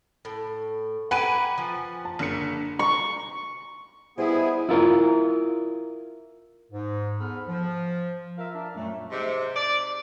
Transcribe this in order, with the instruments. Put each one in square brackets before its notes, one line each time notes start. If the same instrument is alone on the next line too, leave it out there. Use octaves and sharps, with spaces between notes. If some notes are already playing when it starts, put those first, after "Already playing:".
[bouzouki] A2
[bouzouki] G4 B4 [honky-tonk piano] F#5 G#5 D#7 [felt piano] A#5 D7
[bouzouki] F3
[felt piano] A5
[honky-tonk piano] F#1 [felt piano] D3 A#4 C#7
[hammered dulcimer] C#6
[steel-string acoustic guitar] G3 C5 D#5 [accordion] B3 G#4 [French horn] E4
[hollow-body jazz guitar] E4 F4 A#4
[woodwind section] G#2
E2 B3 G#4 A4 B5 F6
F3
F4 A#4 E5 F5
D4 A#4
F#2 A#2 F#3 G3 A3
[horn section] G#2 C3
D5